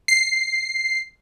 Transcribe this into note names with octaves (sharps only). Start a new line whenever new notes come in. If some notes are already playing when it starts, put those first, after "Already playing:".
C7